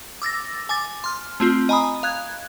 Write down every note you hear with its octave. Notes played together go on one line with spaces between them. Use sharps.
D6 E6 A6 A#6
G#5 D6 A6
C6 F6
A3 C4 F4
D#5 G#5 A#5 B5 D#6
F5 F#6 G#6